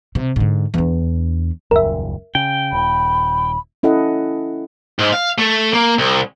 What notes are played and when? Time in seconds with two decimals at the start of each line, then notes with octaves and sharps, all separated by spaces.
0.15 C3
0.36 G#2 D3
0.74 E2 D4
1.71 D#1 C#2 F#2 A#4 E5
2.35 C#3 G5
2.72 D#1 B5
3.83 C#4 E4 A4 D#5 F#5
4.99 G#2
5.13 F5
5.38 A3
5.73 A#3
5.98 C2